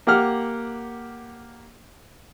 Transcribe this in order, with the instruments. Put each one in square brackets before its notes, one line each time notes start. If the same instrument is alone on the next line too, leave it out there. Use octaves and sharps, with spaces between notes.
[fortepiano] A#3 G4 F#5 F6